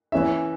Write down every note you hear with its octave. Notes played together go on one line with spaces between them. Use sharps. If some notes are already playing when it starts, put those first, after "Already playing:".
E3 C#4 E4 E5